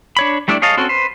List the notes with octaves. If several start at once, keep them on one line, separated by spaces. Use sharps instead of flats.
D4 C#5 B5
G3 A3 D4 E4 D5
G#4 C#5 D#5 F5 A5
C4 C#4 F#4 A4
B4 C5